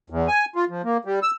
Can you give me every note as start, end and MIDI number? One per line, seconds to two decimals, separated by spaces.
0.10 0.28 40
0.28 0.45 80
0.56 0.65 65
0.69 0.82 53
0.84 0.97 58
1.05 1.20 55
1.23 1.31 88